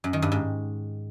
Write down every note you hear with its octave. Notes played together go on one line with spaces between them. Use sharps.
F#2
D#3
G2
G#2